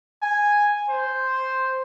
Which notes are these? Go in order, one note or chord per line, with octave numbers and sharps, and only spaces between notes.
G#5
C5